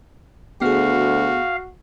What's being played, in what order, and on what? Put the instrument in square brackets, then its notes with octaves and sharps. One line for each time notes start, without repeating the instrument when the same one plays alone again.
[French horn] D2 [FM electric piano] B3 G#4 [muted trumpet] F#4 [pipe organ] F5